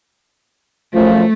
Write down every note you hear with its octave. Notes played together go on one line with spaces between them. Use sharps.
F#2 F3 A3